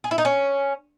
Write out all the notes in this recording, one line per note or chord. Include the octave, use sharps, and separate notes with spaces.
G#4
E4
D#4
C#4